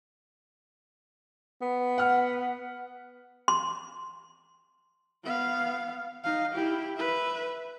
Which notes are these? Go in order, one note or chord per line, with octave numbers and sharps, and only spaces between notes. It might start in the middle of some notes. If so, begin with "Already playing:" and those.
B3
F#5 F6
C6
B3 F5
D#4 F5
E4 G4
B4 E5